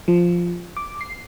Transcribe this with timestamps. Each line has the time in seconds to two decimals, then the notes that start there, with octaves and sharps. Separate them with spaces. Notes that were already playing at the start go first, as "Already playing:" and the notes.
0.08 F3
0.77 D6
1.01 C7